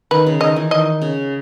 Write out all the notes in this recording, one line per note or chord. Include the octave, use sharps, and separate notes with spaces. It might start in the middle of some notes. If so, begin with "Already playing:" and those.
D#3 B4
C#3
D#3 D#5
E3
D#3 D#5
C#3